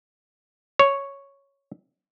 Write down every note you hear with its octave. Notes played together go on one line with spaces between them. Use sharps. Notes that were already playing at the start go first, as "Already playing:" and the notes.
C#5